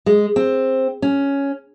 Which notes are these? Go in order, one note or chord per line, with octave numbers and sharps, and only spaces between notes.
G#3
C4
C#4